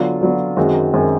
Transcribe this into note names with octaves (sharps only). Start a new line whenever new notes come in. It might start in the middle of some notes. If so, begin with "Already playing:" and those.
Already playing: D3 F#3 B3 F4
D3 F#3 B3
F#2 D#3 G#3 C4 F#4
F#2 D#3 G#3 C4